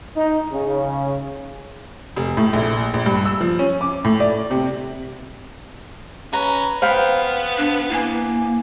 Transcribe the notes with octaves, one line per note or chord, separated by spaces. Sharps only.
D#4
C#3
F1
A2
A#1
A#1
G2
E6
F3
C#4
D6
A2
D5
C3
C#4 B4 A#5
B3 C5 F5 G5 B5
D4
A#3 E4 G#5